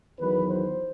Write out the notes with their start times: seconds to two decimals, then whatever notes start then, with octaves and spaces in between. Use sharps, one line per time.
0.19 E2 D#3 F#3 B4
0.47 C5